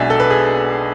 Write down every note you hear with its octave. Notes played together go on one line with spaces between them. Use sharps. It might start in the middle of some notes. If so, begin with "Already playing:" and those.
Already playing: B1 B2 G#3 D4 D5 E5 G#5
A4
B4
G#4